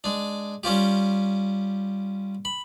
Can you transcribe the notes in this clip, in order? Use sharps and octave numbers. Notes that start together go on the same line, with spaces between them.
G#3 D4
G3 C#4 F4 G4
B5